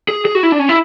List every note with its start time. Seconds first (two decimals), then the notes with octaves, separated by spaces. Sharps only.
0.09 G#4
0.25 G#4
0.35 F#4
0.43 E4
0.52 D4
0.59 C#4
0.69 E4